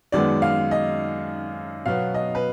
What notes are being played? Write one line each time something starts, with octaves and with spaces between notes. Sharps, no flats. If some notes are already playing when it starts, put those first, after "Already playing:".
F#2 D#3 G#3 B3 D5
F5
D#5
B2 F#3 B3 F5
D#5
B4